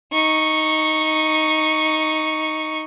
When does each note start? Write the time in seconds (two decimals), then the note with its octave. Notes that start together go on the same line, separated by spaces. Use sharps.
0.12 D#4 C#6